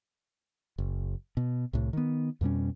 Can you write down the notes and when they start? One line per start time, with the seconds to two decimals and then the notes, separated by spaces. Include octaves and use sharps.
0.78 F#1
1.37 B2
1.73 C2 A2
1.93 D#3 B3
2.41 F2 B2 G3 C#4